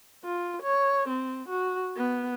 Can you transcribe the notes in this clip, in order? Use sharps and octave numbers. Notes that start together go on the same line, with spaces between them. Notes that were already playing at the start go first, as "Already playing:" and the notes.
F4
C#5
C4
F#4
B3